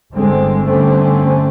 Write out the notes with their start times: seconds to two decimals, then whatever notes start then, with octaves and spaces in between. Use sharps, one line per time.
0.12 G1 D3 G#3 C4
0.64 G2 D3 A3 C4 C#4